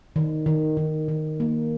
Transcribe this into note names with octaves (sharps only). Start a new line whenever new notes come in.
D#3
D#3
D#3
D#3
A#3